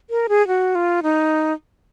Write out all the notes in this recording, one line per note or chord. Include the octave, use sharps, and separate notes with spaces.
A#4
G#4
F#4
F4
D#4